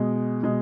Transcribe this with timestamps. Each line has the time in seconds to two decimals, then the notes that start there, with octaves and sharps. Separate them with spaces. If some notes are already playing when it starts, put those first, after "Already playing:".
Already playing: B2 G#3
0.43 B2 G#3